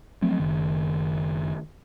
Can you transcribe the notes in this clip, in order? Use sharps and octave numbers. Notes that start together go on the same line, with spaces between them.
F3 F#3 A3 C4
F#1 D#3